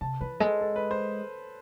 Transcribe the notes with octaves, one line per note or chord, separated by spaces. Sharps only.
C3 A5
E3 B4
G#3 A4
A4
B4
C5